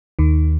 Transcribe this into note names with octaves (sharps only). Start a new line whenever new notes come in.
D#2 D#3